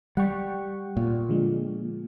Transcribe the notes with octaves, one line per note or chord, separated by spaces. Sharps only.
G3 F#5 G5 C#6
A#2
D3 F3 G#3